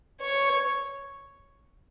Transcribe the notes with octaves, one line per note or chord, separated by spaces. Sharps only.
C#5